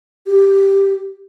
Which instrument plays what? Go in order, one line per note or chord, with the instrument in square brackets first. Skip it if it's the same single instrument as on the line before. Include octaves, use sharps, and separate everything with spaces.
[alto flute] G4